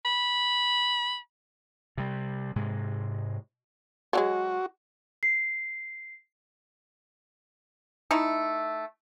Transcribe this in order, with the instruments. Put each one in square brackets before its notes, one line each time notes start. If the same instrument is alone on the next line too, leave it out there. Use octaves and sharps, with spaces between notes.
[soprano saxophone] B5
[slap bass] C3 G3
G#2 C3 G#3
[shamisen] F3 F#3 G#3 [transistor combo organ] F#4
[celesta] C7
[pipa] A3 D#4 E4